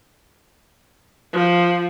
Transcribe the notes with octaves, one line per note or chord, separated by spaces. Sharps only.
F3